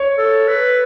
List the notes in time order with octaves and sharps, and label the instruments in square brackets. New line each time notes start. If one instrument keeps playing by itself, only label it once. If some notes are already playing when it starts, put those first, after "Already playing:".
Already playing: [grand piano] C#5
[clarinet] A4
B4